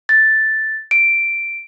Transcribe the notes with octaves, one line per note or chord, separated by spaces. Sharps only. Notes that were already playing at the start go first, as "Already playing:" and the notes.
A6
D7